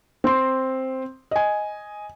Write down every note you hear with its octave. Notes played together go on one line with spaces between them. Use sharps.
C4 C6
D#5 G#5